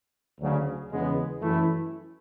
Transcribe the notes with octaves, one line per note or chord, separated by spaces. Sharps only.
D2 C#3 F#3
E2 C#3 G#3 B3
F#2 E3 A3 E4